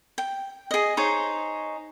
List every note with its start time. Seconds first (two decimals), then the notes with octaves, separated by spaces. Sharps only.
0.18 G5
0.71 G#4 D#5
0.97 D#4 G#4 C5 C#5